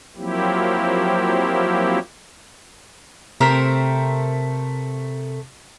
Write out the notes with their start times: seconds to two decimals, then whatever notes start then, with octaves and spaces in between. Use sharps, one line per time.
0.16 F3 F#3 A#3 C4 E4 G4
3.40 C3 A3 C4 A#4 B6